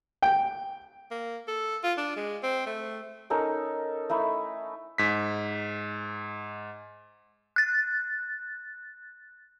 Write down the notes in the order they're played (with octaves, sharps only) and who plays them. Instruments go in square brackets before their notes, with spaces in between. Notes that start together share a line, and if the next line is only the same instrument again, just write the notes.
[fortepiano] G5
[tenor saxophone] A#3
A4
F4
D4
G#3
C4
A3
[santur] C#4 D#4 A4 A#4
A3 D#4 E4
[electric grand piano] G#2 B6
[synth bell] F#6 A6